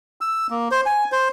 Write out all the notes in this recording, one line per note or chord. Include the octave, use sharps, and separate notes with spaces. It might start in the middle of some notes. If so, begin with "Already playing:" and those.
E6
A#3
C5
G#5
C5